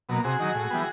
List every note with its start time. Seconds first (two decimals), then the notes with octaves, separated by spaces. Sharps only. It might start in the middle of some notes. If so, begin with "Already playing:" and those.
0.09 B2 F#3 A#3
0.24 C3 F#4 G#4
0.40 D#3 F#3
0.54 A2
0.71 E3 G3 B3